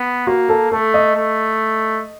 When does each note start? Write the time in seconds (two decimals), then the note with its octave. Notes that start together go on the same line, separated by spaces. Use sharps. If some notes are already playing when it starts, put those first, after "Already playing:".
Already playing: B3
0.27 A#3 F#4
0.49 A4
0.71 A3 A4
0.94 D#5
1.16 A3